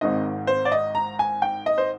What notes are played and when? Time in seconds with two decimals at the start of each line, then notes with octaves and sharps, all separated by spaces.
0.01 G#1 G#2 D#3 G#3 C4 D#5
0.47 C5
0.65 D5
0.72 D#5
0.95 A#5
1.19 G#5
1.42 G5
1.66 D#5
1.78 C5